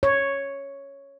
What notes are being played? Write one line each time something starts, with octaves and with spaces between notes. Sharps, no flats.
C#5